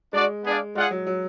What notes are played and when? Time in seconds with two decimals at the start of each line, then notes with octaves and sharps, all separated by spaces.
0.13 G#3 D4 F#4 D5
0.44 B3 D4 G#4 D5 F5
0.75 G#3 F4 G#4 D5 F#5
0.91 F#3
1.07 F#3